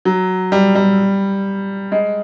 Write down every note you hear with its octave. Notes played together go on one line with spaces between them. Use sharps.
F#3
G3
G3
G#3